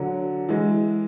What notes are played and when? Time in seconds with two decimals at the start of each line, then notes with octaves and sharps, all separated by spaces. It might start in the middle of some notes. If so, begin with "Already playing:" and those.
Already playing: D3 F#3
0.49 E3 G#3